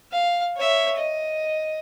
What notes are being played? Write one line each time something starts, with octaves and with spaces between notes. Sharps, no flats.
F5
C#5 E5
D#5